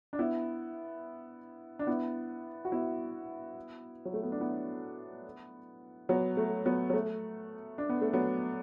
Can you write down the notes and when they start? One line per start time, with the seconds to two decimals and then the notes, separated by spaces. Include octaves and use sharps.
0.13 D4
0.19 B3 E4
1.79 D4
1.87 B3 E4
2.65 F#4
2.72 B3 E4
4.05 F#3
4.14 A3
4.23 B3
4.32 D4
4.40 B3 E4
6.09 F#3 B3
6.37 A3
6.66 F#3 B3
6.90 F#3
6.94 A3
7.78 D4
7.89 B3
8.02 A3
8.13 F#3 B3